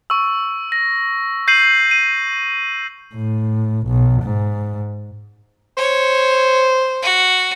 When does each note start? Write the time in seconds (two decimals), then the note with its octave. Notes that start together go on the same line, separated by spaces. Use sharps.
0.10 C#6 E6
0.72 A#6
1.48 G6 C7 D#7 F#7
1.91 D#7
3.15 A2
3.87 B1
4.23 G#2
5.77 C5 C#5
7.02 F#4